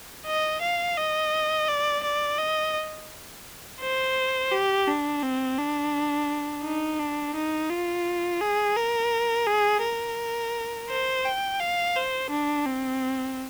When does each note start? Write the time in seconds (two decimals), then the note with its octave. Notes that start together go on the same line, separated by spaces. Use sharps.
0.27 D#5
0.62 F5
0.97 D#5
1.69 D5
2.04 D5
2.39 D#5
3.81 C5
4.52 G4
4.88 D4
5.22 C4
5.58 D4
6.64 D#4
7.00 D4
7.36 D#4
7.71 F4
8.41 G#4
8.76 A#4
9.47 G#4
9.83 A#4
10.90 C5
11.25 G5
11.60 F5
11.96 C5
12.31 D4
12.66 C4